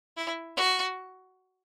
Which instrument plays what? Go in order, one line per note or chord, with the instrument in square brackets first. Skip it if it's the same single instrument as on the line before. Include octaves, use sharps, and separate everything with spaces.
[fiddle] E4
F#4